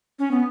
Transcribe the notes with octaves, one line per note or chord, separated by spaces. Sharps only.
C#4
B3